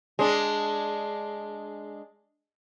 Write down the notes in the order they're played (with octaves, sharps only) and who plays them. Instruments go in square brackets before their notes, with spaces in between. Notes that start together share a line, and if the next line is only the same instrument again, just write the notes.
[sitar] G#3 D4